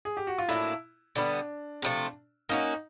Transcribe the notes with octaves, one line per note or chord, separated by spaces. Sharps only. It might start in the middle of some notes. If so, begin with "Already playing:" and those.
G#4
G4
F#4
F4
A2 F#3 A#3 D4 E4
D3 G3 B3 D4
C3 F3 A3
A#3 C#4 D#4 F#4